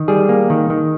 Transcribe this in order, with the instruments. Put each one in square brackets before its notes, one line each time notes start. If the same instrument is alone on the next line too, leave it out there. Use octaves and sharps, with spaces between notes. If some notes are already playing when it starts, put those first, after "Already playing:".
Already playing: [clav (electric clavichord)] D#3
G3 G#4
A#3
D#3
D#3